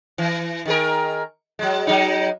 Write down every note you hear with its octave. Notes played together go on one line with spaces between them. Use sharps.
E3
D#3 G#4 A#4
F#3 G#3
F#3 G#3 D#4